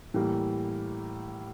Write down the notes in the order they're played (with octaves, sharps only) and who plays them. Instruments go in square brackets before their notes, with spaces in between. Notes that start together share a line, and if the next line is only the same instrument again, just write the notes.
[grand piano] A2 E3 G3 A#3